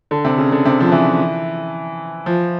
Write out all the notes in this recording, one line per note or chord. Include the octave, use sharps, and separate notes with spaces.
D3
C3
C#3
D3
C3
F3
E3
F3